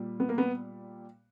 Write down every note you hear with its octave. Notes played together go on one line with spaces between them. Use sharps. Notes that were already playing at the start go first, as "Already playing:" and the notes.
Already playing: A#2 G3
B3
A#3
B3